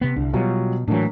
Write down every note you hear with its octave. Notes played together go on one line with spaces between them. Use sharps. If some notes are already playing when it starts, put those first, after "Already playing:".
C3 B3
C2 D3
B2 F#3 G3 F4
A2 E3 F#3 A#3 D4